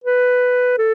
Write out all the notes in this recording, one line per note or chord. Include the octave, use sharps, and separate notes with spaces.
B4
A4